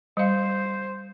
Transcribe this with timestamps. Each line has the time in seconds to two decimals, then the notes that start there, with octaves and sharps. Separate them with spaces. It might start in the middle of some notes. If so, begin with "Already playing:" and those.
0.17 G3 C5 F5